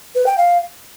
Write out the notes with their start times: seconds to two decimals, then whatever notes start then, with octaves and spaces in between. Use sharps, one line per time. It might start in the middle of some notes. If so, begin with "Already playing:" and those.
0.15 B4
0.26 G5
0.38 F5